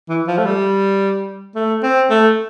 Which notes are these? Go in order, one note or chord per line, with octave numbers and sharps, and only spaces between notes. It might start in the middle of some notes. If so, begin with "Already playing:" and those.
E3
F3
A3
G3
A3
C4
A3